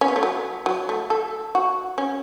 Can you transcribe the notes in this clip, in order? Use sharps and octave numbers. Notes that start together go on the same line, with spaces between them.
C#4
B3
A3
F#3
F#3
A3
A4
F#4
C#4